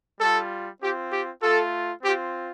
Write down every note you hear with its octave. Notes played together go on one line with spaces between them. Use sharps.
G3 F4 A4
C4 F4 G4
G4
A3 F4 A4
C4 F4 G4